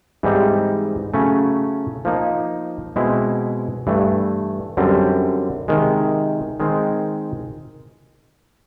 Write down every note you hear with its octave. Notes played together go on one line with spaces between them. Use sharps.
G#2 E3 G3 C4 D#4
C#3 F#3 A3 C#4
F3 A#3 D#4
B2 G#3 C4 E4
G2 E3 A3
F#2 D3 G3 C4
C3 D#3 G#3
D#3 G#3 C4